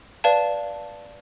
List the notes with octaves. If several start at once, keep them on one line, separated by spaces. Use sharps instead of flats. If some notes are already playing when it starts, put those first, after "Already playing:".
B4 D5 F5 A5